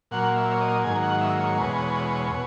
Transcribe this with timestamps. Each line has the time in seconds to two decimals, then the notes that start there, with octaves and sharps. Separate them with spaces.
0.11 A#2 F#3 A#3 F#5
0.36 E5
0.52 C#5
0.61 D#5
0.84 G#2 D#3 F#3 A#3 G#5
1.03 F#5
1.21 E5
1.40 C#5
1.58 E2 B2 G#3
2.31 B2